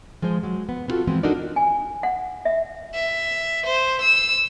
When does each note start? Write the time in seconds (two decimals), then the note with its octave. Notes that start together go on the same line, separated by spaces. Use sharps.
0.22 F3 G#3 G#4 C5
0.43 F#3 G#3
0.69 B3
0.88 B3 C4 F4 F#4 A4
1.07 E3 F3 G#3 B3 C4
1.23 D4 D#4 F#4 A4 A#4 D5
1.56 G#5
2.03 F#5
2.45 E5
2.94 E5
3.66 C5
4.02 E6